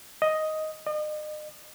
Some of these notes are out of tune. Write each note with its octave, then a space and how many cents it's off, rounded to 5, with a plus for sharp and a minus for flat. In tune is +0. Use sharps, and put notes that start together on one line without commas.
D#5 +5
D#5 -40